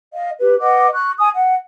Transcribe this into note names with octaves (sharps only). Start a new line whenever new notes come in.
D#5 F5
G4 B4
B4 D#5 F#5 D6
C#6 F#6
G#5 D#6
F#5